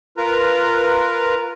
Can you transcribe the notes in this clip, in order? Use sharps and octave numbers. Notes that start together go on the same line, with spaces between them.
F4 A#4 B4 A#5